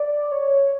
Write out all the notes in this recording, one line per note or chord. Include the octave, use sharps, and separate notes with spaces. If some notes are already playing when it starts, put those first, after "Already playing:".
Already playing: D5
C#5